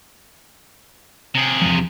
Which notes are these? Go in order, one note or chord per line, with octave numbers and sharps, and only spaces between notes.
C3 G#4
E2 G2 F3